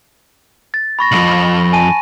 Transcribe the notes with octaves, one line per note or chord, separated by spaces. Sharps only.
A6
B5 C#6 A#6
B1 F2 F#7
G#5 A5 D#7